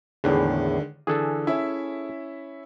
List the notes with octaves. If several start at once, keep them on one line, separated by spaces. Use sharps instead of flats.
E2 A2 D3 D#3 G#3
D3 E3 G#4 A4
C#4 E4 E5